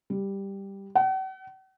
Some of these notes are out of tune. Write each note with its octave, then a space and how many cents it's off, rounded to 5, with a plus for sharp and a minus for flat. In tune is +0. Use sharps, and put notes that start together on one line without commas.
G3 +5
F#5 +45